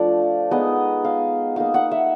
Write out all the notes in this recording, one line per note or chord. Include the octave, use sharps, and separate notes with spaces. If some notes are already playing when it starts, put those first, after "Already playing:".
Already playing: F3 A3 D4 D5
G#3 B3 D#4 D#5
F5
A#3 D#4 F5
F#5
E5